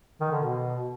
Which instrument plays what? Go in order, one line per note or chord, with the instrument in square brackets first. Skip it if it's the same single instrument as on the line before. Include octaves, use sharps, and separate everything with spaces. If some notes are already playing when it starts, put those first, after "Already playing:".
[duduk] D#3
D3
B2